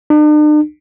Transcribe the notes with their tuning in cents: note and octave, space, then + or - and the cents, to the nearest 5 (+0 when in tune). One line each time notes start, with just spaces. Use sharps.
D4 +45